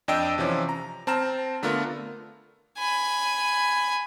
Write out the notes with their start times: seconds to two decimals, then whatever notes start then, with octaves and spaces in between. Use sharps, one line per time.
0.08 F2 D4 D#5 G5 E6 D7
0.38 C3 E3 F3 C#4
0.69 A#5
1.07 C4 A5 A#5 F6 E7
1.62 D3 A3 B3 D4 F4 A#4
2.78 G#5 B5